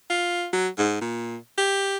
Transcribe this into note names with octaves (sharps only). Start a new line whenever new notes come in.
F4
F#3
G#2
A#2
G4